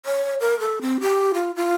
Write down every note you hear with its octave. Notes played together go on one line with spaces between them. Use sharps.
C#5
A#4
A4
C4
G4
F4
F4